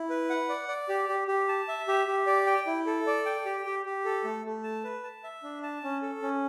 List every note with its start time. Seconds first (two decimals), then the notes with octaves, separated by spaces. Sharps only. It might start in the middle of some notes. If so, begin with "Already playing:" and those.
Already playing: E4
0.10 B4
0.30 F#5
0.49 D5
0.68 D5
0.89 G4
1.09 G4
1.28 G4
1.49 A5
1.68 E5
1.88 G4
2.07 G4
2.27 D5
2.46 G5
2.67 E4
2.86 A4
3.07 D5
3.26 G5
3.45 G4
3.66 G4
3.85 G4
4.05 A4
4.24 A3
4.45 A3
4.64 A5
4.84 B4
5.03 A5
5.24 E5
5.43 D4
5.63 A5
5.84 C#4
6.02 A4
6.22 C#4